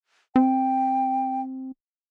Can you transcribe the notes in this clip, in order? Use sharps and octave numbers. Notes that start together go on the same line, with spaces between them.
C4 G5